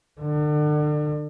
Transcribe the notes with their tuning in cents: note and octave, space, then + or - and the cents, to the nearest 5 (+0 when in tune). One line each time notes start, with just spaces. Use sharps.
D3 +35